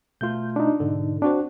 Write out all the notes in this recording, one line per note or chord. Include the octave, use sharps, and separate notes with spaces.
B2 A3 F4 G6
D4 D#4
G#2 B2 D3
C4 D4 F#4 C5